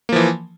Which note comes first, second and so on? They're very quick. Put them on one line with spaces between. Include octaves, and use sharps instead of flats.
A#3 F3 E3